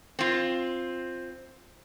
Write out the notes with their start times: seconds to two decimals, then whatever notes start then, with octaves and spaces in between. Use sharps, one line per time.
0.19 C4 F4